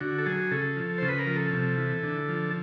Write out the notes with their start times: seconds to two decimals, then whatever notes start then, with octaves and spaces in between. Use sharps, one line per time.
0.01 D3 F#4
0.18 A4
0.26 F#3 G#4
0.51 C#3 A4
0.76 F3
0.98 C#3 C5
1.08 B4
1.19 A#4
1.27 F3
1.36 A4
1.53 C3
1.78 E3
2.03 D3
2.28 F3